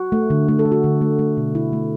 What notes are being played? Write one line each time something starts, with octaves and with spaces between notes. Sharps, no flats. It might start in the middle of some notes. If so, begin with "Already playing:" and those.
Already playing: F#4
A3
D3
A3
A4
A3
F#4
D3
A3
A3
B2
A3 E4
A3